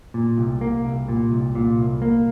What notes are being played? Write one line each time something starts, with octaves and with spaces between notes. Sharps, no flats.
A#2
C2
A#3
C2
A#2
C2
A#2
C2
A#3